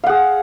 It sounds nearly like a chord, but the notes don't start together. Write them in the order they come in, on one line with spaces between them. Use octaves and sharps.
F5 F#5 G#4